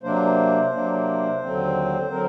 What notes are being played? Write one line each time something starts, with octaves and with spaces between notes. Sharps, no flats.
C3 F#3 A#3 D4 C5
C3 F#3 A#3 D4
D#2 D3 F#3 C4
D3 F#3 C4 A#4